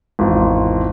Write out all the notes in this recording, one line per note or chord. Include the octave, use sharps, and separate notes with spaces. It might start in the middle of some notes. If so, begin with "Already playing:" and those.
G#1 E2 F4